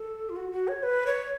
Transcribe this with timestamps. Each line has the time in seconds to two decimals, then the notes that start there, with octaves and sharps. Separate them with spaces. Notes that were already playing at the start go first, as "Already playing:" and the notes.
Already playing: A4
0.29 F4
0.36 F#4
0.52 F#4
0.68 C#5
0.83 B4
1.07 C#5